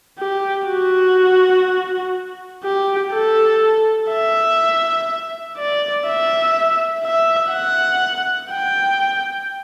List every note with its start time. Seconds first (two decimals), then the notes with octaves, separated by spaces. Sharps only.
0.19 G4
0.68 F#4
2.64 G4
3.13 A4
4.11 E5
5.58 D5
6.07 E5
7.05 E5
7.53 F#5
8.51 G5